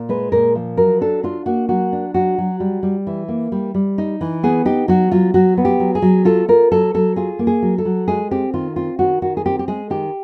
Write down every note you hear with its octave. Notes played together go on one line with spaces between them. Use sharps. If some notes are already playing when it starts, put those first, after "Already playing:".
Already playing: A#2
G#3 B4
A#2 A#4
F3
F#3 A#4
D4 A4
D4 F4
A#3 F#4
F#3 F#4
D4
F#3 F#4
F#3
G3
G3
E3
A#3
G3
G3
D#4
E3
B3 G#4
D#4 G4
F#3 F#4
F#3 F4
F#3 F#4
B3
G4
F#3
G#4
F#3
F4 A4
F4 A#4
F#3 A4
F#3 A4
F4 G#4
A#3
G#4
F#3
A4
F#3
G#3 G#4
C4 G4
D#3 F4
C4 F4
D#3 F#4
D#3 F#4
G#4
C4 G4
G4
G#3 G#4
D#3 G4